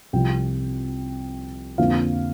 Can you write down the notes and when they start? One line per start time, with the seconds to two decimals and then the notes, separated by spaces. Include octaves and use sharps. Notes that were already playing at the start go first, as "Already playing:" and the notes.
0.13 C2 C3 F3 G5
1.78 F2 D3 F3 A#3 F5